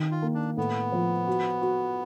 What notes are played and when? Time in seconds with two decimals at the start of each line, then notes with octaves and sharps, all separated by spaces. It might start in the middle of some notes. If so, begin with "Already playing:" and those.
Already playing: D#3
0.11 F4
0.22 A#3
0.34 D4
0.57 A2 B3
0.92 F3
1.27 F#4
1.62 F#4